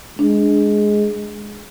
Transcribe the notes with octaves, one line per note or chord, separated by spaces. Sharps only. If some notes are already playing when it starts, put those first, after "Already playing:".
G#3 D4